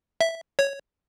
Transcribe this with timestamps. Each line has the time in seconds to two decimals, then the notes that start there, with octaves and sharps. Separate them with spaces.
0.21 E5
0.59 C#5